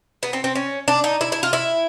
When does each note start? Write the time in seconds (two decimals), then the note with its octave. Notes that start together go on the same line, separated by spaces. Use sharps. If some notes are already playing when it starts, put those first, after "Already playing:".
0.23 B3
0.33 C4
0.44 C4
0.55 C#4
0.88 D4
1.04 D#4
1.21 E4
1.32 E4
1.43 F4
1.53 E4